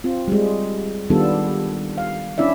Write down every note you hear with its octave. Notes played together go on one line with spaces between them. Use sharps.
C4 F4
G3 G#3
D#3 G3 B3 D4 F4 A4
F5
C#4 D4 E4 D5 E5